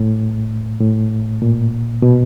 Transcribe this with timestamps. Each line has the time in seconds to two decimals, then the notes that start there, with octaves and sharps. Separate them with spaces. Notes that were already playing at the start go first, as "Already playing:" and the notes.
Already playing: A2
0.81 A2
1.42 A#2
2.02 B2